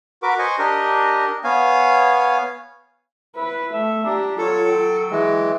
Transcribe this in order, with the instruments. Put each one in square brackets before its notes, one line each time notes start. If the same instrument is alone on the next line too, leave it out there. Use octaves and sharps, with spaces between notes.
[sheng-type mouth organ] F#4 A#4 B4 D6
C5 D#5 G#5 C#6
D4 G4 A#4 D#5
B3 C#5 F5 G#5
[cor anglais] E4 [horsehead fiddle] B4
[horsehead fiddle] A3 [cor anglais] E5
[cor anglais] D4 [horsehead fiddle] G4 A#5
[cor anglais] F#3 [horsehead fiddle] F4 C#5 [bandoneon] A4
[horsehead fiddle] G5
[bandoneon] E3 G#3